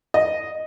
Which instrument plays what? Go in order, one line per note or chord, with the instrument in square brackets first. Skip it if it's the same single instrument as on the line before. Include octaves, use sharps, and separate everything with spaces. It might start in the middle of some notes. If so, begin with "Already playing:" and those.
[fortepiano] D#5